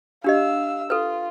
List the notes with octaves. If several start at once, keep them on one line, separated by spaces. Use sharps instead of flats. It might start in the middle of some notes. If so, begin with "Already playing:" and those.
D4 G4 D#5 F5 E6
F4 A4 B4